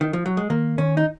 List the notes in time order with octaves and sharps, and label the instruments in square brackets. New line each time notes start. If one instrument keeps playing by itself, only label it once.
[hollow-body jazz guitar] D#3
F3
F#3
G#3
[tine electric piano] D#3 [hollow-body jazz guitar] A#3
[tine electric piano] D#3 [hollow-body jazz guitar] C#4
[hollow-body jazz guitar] D#4